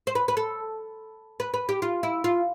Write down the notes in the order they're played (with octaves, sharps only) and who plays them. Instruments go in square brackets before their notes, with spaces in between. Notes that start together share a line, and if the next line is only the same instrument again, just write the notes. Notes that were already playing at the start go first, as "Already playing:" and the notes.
[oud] C5
B4
B4
A4
B4
B4
G4
F4
E4
F4